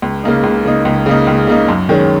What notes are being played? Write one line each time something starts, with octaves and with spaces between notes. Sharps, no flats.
C#2
C#3 A#3 D#4
C#2
C#3 A#3 D#4
C#2
C#3 A#3 D#4
C#2
C#3 A#3 D#4
F#2
D#3 G#3 C#4